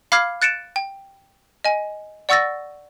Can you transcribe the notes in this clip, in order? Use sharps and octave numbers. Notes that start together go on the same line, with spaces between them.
F5 B5 D6 F6 G#6 C7
F#6 A6 C#7 D7 E7
G5
D#5 G#5
D5 F#5 C#6 E6 A6 A#6